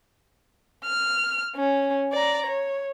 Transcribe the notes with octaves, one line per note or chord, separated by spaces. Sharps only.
F6
C#4
D5 A#5
C#5